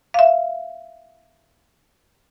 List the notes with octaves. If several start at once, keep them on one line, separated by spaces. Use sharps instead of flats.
E5 F5